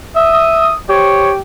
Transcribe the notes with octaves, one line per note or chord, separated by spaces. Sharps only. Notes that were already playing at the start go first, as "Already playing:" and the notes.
E5 D#6
G4 C5 C#5